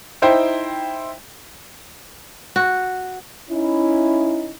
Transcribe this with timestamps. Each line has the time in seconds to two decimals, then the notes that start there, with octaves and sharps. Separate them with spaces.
0.22 D#4 E4 C5 G5
2.56 F#4
3.50 C#4 D#4 E4